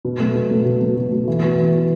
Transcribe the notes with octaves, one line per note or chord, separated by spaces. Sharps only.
B2
F#3 A3
B2
F#3 A3
B2
F#3 A3
B2
F#3 A3
E3
B3 F#4
E3
B3 F#4